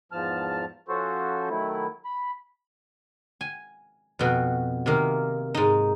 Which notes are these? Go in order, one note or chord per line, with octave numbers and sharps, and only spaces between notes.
E2 G#2 F3 A5 F6
F3 C#4 F#4 A4 C5
D#3 F#3 A3 E4
B5
G#5
F2 B2 F#4
C3 D#3 A#3
G#2 D#4